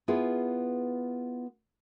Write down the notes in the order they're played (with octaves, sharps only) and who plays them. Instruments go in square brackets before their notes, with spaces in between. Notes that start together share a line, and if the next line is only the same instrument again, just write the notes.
[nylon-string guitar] B3 E4 F4 G#4 B4